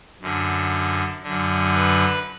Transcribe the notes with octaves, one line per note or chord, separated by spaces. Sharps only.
F#2 D3
F#2 D3
B4